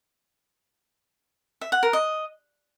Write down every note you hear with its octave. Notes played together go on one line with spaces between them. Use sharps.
E5
F#5
A#4
D#5